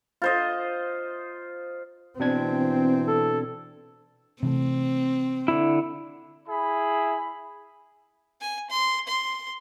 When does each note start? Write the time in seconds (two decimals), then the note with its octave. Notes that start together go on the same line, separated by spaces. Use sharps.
0.22 F4 C5 D#5
2.20 B2 E3 C4 D4 G#6
3.08 A4
4.43 C3 E3 A3 C4
5.48 D3 E4
6.47 E4 G#4 B5
8.41 G#5
8.70 C6
9.07 C6